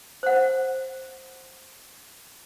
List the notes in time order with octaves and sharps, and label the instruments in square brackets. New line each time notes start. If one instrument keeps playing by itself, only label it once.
[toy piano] C5 F#5